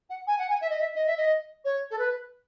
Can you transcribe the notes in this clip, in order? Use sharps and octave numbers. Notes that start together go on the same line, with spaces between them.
F#5
G#5
F#5
G#5
E5
D#5
E5
D#5
E5
D#5
C#5
A4
B4